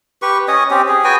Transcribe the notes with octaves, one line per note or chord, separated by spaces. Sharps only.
G4 B4 C#6
C#4 C#5 D#5 D#6
C4 C#4 G4
G#4
F#4 B4 G5 G#5